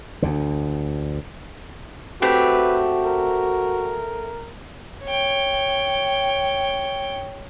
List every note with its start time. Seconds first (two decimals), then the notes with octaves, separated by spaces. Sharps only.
0.22 D2 D3
2.22 A3 C4 F#4 G4 B4
3.05 A#4
5.05 C#5 G5